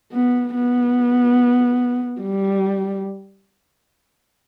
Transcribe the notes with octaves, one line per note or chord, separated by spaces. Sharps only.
B3
B3
G3